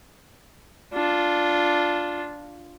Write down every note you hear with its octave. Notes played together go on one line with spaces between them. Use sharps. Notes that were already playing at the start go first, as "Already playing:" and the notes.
D4 F4